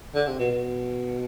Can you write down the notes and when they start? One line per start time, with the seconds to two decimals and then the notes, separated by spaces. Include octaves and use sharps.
0.15 D3
0.27 C3
0.39 B2
0.51 B2